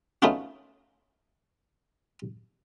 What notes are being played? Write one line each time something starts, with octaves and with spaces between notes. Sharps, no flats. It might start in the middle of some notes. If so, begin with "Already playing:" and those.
A3 B3 C#4 D#4 F4 F#4